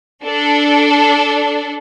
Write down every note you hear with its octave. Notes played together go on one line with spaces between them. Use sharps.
D4 A4